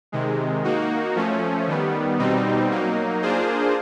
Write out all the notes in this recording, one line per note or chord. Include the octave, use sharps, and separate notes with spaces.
C3 D#3 G#3
A#3 D#4 F#4
F3 A3 C#4
D#3 G3 B3
B2 G3 C4 D#4
F#3 A#3 D#4
A#3 D4 F4 G#4 C5